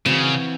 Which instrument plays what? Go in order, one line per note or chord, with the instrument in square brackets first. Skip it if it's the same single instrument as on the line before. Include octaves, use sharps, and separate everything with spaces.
[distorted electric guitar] C#3 [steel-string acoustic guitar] E3 C4 F#4